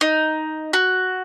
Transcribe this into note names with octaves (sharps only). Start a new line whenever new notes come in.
D#4
F#4